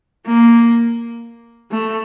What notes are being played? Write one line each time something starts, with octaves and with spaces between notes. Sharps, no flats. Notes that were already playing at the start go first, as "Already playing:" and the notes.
A#3
A3